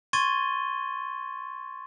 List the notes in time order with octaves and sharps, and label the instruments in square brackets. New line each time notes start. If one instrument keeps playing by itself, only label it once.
[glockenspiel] C6 C#6 G#6 A6 D#7 G7